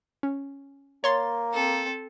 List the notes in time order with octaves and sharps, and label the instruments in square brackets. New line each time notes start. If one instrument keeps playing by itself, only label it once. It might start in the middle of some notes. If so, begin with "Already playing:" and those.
[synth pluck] C#4
[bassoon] A#3 [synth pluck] C#5 C6 A6
[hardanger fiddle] C4 A4